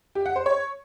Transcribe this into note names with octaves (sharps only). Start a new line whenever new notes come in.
G4
F#5
C5
C#5